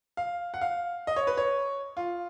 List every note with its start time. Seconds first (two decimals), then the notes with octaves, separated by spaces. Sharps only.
0.17 F5
0.54 F#5
0.61 F5
1.07 D#5
1.16 C#5
1.27 B4
1.38 C#5
1.97 F4